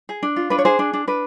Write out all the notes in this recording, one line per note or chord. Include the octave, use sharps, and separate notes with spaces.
G#4
D4
F4
D4 B4
C#5
G#4 C5
D4
D4
D4 B4